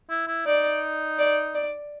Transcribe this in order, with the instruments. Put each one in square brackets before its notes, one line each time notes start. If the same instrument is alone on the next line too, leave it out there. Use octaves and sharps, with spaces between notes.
[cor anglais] E4
E4
[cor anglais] D#4 [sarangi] D5
[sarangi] D5
D5